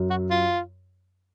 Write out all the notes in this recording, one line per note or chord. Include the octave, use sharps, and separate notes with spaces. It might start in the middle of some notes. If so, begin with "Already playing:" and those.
Already playing: F#2 F#3
F#4
F4